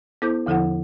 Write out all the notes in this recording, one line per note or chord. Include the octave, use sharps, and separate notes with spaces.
B3 E4 A4 C5 D6 G6
E2 D3 F3 E4 A4 F#5